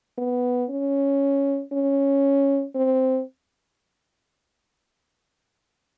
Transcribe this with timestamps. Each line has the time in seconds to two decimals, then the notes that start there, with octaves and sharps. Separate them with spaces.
0.18 B3
0.70 C#4
1.73 C#4
2.76 C4